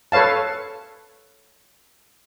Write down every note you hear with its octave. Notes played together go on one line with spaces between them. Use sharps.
A4 B4 C#5 F5 A5